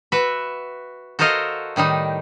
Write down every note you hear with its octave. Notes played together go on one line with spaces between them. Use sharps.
F#4 B4 E5
F#4 A4 A#4 C5 D#5 F5
A2 D#3 G3 D#4